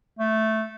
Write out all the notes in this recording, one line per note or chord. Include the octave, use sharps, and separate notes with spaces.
A3